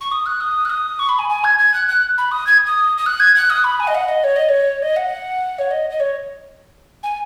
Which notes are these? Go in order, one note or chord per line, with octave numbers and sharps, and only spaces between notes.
C#6
D#6
F#6
D#6
F#6
D#6
C#6
B5
G#5
G#5
G#6
G#6
F#6
F#6
B5
D#6
G#6
D#6
D#6
F#6
G#6
F#6
D#6
B5
G#5
D#5
F#5
D#5
C#5
D#5
C#5
D#5
F#5
C#5
D#5
D#5
C#5
G#5